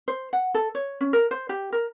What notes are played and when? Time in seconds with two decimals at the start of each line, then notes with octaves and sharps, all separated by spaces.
0.08 C5
0.33 F#5
0.54 A4
0.75 C#5
1.01 C#4
1.13 A#4
1.31 C5
1.49 G4
1.72 A#4